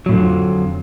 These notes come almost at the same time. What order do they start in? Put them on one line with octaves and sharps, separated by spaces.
F#3 A2 D3 F3 F2